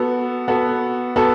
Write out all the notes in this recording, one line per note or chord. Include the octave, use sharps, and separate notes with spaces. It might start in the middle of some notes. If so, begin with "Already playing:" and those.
Already playing: B3 F#4 A4
B3 F#4 A4
B3 F#4 A4